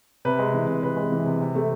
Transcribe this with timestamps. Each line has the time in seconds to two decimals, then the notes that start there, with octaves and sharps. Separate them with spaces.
0.25 C3 B4
0.39 G#3
0.54 E3
0.67 C3
0.83 C3 B4
0.97 G#3
1.12 E3
1.26 C3
1.41 C3
1.55 A3